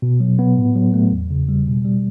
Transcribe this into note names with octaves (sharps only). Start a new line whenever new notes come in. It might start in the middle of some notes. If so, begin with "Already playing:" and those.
B2
F#3
B3
A2
F#3
A3
E2
C#3
G3
B2
G3